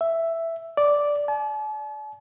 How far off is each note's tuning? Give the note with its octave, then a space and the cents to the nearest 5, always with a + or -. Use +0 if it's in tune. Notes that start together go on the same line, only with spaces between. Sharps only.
E5 +5
D5 -5
A5 -45